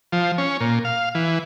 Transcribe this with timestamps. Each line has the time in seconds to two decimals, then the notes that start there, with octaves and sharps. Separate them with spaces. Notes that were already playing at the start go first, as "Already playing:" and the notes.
0.12 F3
0.38 C#4
0.60 A#2
0.85 F5
1.15 E3